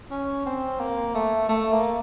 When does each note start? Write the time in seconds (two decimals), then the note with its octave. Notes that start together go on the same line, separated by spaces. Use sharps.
0.11 C#4
0.46 C4
0.80 A#3
1.15 A3
1.49 A3
1.72 A#3